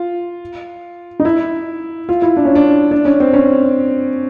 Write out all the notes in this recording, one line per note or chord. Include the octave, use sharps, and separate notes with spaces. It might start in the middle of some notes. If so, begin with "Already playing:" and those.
Already playing: F4
D#4
E4
F4
E4
D4
C#4
D4
D4
C#4
C4
C#4